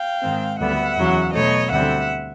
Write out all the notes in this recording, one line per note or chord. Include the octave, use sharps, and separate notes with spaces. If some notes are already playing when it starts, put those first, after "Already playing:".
Already playing: F5 G5
G#2 D#3 G#3 C4
D2 D3 G3 B3 E5 F#5
E2 C#3 F#3
B2 F#3 A3 C#5 D#5
D2 D3 G3 C4 E5 F#5